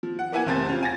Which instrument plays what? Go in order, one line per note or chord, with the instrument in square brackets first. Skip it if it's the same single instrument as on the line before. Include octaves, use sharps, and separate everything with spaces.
[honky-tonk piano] F3
F#5
A#3 B3 E4 F#5 G#5
F1 C3 C4 G4 A5 A6
C#4 F4
G#5 A6 A#6